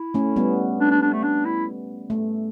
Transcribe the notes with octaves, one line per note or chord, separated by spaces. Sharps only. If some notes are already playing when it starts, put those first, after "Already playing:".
Already playing: E4
A3 C#4
G3 B3
D4
D4
D4
A3
D4
E4
A3